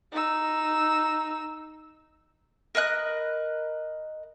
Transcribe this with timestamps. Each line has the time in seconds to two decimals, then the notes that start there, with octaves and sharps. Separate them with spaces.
0.12 D#4 E6
2.75 A#4 B4 D#5 F#6